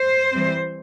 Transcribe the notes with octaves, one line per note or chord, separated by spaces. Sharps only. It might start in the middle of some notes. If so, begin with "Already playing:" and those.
Already playing: C5
E3 G3 C4